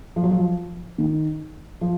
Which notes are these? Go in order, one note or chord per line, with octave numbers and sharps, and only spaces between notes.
F3
F#3
F3
D#3
F3